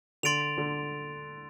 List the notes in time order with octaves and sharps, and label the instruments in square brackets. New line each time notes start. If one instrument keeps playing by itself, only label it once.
[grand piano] D3 [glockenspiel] C6 A6 D7 F7
[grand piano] D3